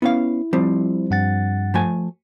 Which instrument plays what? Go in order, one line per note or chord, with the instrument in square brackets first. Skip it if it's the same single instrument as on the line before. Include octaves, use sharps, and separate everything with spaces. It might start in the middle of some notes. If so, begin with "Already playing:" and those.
[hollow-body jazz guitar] B3 C#4 F5 [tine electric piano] E4
[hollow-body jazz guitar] F3 G3 C4
[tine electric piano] G2 F#5 A6
[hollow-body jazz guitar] F3 A3 G#5